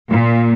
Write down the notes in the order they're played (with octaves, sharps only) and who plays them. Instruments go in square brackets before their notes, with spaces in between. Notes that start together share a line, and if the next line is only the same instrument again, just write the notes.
[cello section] A#2